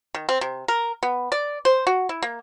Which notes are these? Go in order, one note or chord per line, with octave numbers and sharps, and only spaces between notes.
D#3
C4
C3
A#4
B3
D5
C5
F#4
E4
A#3